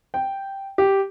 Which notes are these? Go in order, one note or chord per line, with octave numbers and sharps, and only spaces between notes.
G5
G4